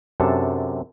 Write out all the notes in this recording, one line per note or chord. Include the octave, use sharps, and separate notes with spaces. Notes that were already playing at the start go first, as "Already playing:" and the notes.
F#2 C3 D4 A4 A5